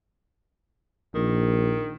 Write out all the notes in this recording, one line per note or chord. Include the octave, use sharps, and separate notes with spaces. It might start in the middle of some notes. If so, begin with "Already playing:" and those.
A#1 D#3